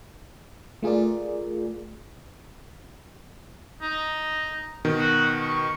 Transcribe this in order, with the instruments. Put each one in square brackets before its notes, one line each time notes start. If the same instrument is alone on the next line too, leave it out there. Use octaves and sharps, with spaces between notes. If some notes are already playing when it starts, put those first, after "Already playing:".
[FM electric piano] A3 F4 G#4 A#4 D5
[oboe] D#4
[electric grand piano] B2 D#3
[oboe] F#4
C#6